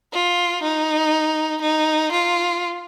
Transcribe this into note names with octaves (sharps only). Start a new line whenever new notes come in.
F4
D#4
D#4
F4